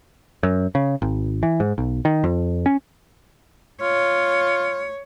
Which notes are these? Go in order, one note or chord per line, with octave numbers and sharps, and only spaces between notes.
F#2
C#3
G#1
E3
G#2
B1
D#3
F2
C#4
F4 C#5